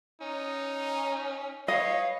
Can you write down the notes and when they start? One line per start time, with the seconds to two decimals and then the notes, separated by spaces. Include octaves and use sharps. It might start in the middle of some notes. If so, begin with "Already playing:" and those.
0.21 C#4 D#4
1.68 B4 C#5 D#5 F5